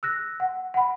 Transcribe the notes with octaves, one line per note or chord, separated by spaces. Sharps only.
E6 F#6 A#6
F#5
F#5 B5